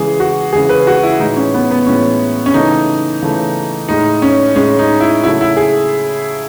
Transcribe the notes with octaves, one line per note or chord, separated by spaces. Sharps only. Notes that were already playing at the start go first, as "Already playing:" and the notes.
Already playing: C#3 E3 G#3 G#4
F#4
C#3 E3 G#3 G#4
B4
F#4
E4
A2 E3 G#3 D#4
C#4
B3
B3
A2 E3 G#3 C#4
C#4
C#3 E3 A3 D#4
C#3 E3 A3
A2 G#3 D#4
C#4
A2 G#3 C#4
D#4
E4
C#3 F#3 A3 E4
E4
G#4